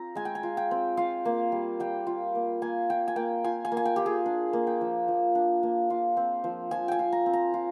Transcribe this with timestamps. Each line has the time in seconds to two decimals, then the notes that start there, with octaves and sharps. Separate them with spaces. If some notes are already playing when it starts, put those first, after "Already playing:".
Already playing: C4 F4 A#5
0.15 G#3 G#5
0.25 G5
0.35 G#5
0.43 F4
0.57 G5
0.71 C4
0.97 F4 F5
1.25 A#3
1.52 G3
1.80 G3 G5
2.07 F4
2.35 A#3
2.62 A#3 G#5
2.90 F4 G5
3.08 G#5
3.16 A#3 G5
3.44 F4 G#5
3.65 G#5
3.72 A#3
3.77 G#5
3.85 G5
3.96 F4 G4
4.06 G#4
4.26 D4
4.53 A#3
4.67 G5
4.81 F3
5.08 F3
5.35 D4
5.63 A#3
5.90 F4
6.17 C4
6.44 F3
6.71 F3 G#5
6.88 G5 G#5
6.99 F4
7.12 A#5
7.26 C4
7.33 A#5
7.54 F4